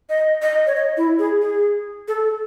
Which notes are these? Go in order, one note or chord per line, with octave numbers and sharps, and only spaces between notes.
D#5
D#5
C#5
D#5
E4
G#4
G#4
A4